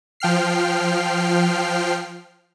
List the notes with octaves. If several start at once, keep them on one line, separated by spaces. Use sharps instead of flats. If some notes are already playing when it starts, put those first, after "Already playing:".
F3 G5 F6 C7